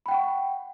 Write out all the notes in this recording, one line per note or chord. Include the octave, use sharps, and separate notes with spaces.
F#5 G5 B5 C#6